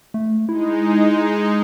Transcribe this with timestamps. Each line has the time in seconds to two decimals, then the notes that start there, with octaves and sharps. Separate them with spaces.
0.14 A3
0.49 G#3 D#4 E4